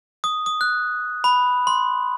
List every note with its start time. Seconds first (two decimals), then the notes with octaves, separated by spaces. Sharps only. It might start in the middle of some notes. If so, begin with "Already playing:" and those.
0.24 D#6
0.46 D#6
0.61 F#6
1.24 B5
1.67 C6